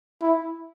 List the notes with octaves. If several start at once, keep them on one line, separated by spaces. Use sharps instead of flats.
E4